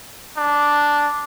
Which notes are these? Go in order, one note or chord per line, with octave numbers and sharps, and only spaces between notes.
D4